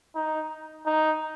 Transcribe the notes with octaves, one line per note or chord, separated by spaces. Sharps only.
D#4
D#4